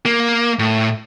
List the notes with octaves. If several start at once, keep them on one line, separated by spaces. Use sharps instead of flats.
A#3
A2